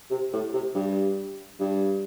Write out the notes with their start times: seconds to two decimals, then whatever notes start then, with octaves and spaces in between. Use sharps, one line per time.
0.10 C3
0.33 A2
0.53 C3
0.75 G2
1.60 G2